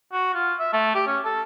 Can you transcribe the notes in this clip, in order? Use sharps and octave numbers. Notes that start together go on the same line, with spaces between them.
F#4
F4
E5
A3
G4
C#4
A4